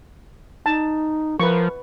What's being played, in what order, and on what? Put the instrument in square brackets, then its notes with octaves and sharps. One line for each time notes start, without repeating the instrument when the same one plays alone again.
[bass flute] D#4 [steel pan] A5
[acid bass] F3 [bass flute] A#4 [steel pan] B4 C#6